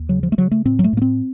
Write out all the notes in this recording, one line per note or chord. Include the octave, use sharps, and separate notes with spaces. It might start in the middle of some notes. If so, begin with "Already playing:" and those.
Already playing: D#2
C#3 F#3
F3
A3
C#3 F#3
A3
A2 C4
F#3
A3
A2 A#3
C4